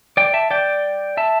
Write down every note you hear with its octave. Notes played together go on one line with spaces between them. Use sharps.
D5 G5
E5 A5
D5 G5
E5 A5